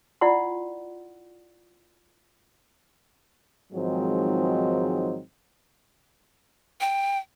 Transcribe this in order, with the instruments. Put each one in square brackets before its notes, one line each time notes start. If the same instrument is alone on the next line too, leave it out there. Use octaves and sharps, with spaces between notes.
[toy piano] E4 F4 D5 F#5 C6
[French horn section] G#2 D#3 F3 F#3 G#3 C4
[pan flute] G5